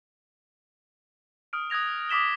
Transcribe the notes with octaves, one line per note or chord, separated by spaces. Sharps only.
D#6 F6 D7
D#6 F#6 G#6 A#6 F7
D6 D#6 B6 E7 G7